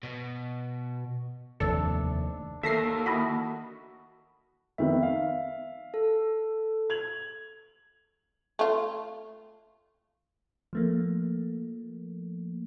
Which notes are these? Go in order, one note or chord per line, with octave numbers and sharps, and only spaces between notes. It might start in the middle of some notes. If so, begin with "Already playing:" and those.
B2
F1 D#2 A3 D4 A4
D#2 D#3 A#3 A4 E5 A#6 C7
E4 F#4 D#5 B5
F2 D#3 B3 E5
F5
A4
G#6 F7 F#7
A3 F4
F3 A3 A#3